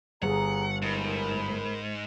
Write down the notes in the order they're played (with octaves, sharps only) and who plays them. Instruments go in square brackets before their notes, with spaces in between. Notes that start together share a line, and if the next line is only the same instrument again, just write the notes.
[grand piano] G1 [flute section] G#4 A#5 [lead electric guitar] F#5
[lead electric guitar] G#2 [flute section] A#4 B5